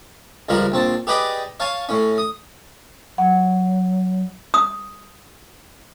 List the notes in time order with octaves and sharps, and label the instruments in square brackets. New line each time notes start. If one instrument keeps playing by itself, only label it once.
[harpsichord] C#2 F3 G3 A#4 A#5
A#1 C4 A5
G4 G#4 B4 D5 D#5 G5
C#5 F5 G#5 A5
A2 C#4
D#6
[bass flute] F#3 [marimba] F#5
[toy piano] D#6